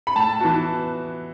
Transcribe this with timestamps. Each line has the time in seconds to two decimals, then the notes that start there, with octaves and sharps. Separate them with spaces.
0.07 B5
0.16 A2 A5
0.40 E3 B3 F#4